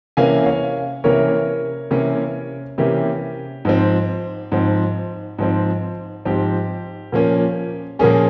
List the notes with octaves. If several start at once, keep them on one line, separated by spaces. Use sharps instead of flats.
C3 E3 A#3 C#4 F5 G#5
C#5 F5
C3 E3 A#3 C#4 A#4 C#5
C3 E3 A#3 C#4
C3 E3 A#3 C#4 G4
G#2 F3 C4
G#2 F3 C4
G#2 F3 C4
G#2 F3 C4 G4
A#2 F3 A#3 C#4
A#2 F3 A#3 C#4 G#4